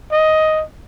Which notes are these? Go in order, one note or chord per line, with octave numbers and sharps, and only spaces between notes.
D#5